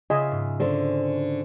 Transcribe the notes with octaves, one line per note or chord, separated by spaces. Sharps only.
C#3 F4 G#4 D#5 E5 G#5
G#2
D3 C#4 C5